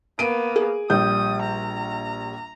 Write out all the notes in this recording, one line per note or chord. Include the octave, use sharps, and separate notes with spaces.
A#3 B3 D7 D#7
G#4
A#1 G3 D#6 G6
A#5